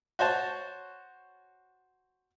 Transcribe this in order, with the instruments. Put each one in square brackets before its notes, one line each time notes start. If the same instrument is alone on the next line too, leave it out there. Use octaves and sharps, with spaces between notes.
[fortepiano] F#4 C5 C#5 A5